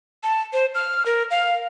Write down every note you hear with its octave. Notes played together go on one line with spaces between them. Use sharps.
A5
C5
F6
A#4
F5